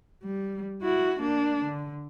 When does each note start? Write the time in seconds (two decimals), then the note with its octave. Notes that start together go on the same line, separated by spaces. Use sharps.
0.23 G3
0.81 E4 F#4
1.20 A#3 D4
1.64 D3